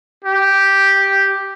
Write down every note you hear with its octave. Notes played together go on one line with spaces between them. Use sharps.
G4